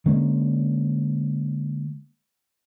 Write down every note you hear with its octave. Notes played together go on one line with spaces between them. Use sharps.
D3 G#3 A#3 C#4